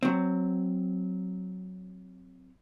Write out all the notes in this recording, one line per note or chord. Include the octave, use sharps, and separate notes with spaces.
F#3 C4